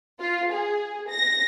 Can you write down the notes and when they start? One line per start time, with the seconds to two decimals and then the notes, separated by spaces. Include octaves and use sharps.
0.20 F4
0.52 G#4
1.10 A#6